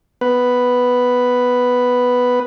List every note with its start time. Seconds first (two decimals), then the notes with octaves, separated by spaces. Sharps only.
0.21 B3 B4